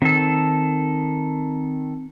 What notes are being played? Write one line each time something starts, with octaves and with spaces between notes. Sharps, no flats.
D#3 C4 A4